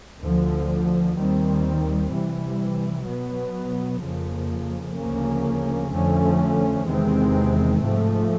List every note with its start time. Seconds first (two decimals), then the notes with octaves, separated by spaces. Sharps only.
0.21 D2 D3 F3
1.16 D#2 D#3 G3 C4
2.11 C3 E3 G3
3.06 B2 F#3 B3
4.01 F2 C#3 F3 A#3
4.96 D2 C#3 F3 A#3 C#4
5.92 F2 D3 F3 A3 C#4
6.87 E2 C3 D#3 G#3 C4
7.82 G#2 F3 A3